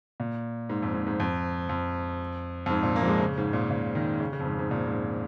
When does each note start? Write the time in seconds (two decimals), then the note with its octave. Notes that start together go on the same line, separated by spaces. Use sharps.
0.20 A#2
0.69 G#2
0.82 F2
0.94 G#2
1.07 G#2
1.20 F2
1.69 F2
2.66 F2
2.70 G#2
2.83 A#2
2.96 A#3
3.03 F3
3.07 G#3
3.20 C#3
3.38 G#2
3.53 A#2
3.71 A#2
3.95 D#3
4.20 C#3
4.33 C#3
4.40 F2
4.46 G#2
4.59 G#2
4.71 A#2
4.87 G#2